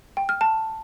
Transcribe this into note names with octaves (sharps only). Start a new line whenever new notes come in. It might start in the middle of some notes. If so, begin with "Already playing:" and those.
G5
F6
A5